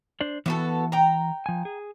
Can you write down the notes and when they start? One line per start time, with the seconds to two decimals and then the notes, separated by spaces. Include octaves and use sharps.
0.21 D4 C5 D5
0.46 E3 B3 F#4 A4
0.92 G5 A#5
1.46 F3 G#5
1.65 G#4